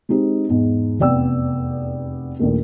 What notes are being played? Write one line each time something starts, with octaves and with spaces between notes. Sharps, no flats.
G#3 C4 D#4 G4
E2 G#2
F1 E2 B3 D5 G5 E6
A#1 D#2 A3